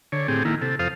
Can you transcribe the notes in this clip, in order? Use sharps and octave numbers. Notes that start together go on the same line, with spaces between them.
D3 C#5
A2 C4 G4 G#4
D#3 A#3 E4
C3 A4
F2 A4 C5 F5 D#6